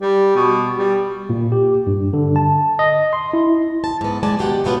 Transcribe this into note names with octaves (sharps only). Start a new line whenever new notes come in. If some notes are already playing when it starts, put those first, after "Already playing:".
G3
B2
G3
A#2
G4
G2
D3
A5
D#5
C6
E4
A5
G#2 B3
G#3 D5 G#5 A5
B2 D#3 G4 B4 F#5
F#2 F#3 A3 B3 F4 F#5